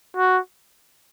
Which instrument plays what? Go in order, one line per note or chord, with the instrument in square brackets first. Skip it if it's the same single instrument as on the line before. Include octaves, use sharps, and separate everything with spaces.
[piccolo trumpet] F#4